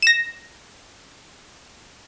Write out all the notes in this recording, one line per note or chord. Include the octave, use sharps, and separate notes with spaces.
A#6 E7